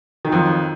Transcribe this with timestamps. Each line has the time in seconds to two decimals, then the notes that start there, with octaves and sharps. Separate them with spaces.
0.25 D#3
0.28 F#3
0.32 F2